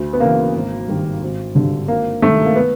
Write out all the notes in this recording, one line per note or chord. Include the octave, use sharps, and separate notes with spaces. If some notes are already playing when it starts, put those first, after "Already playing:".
Already playing: D2
B3
C#3 E3 A#3
G#1
G2 D#3
G#1
G2 D3
G#1 A#3
G2 D#3 A3
A#3
B3